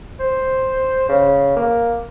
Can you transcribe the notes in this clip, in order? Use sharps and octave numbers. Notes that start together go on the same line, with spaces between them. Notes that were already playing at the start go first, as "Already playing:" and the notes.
C5
C#3
A#3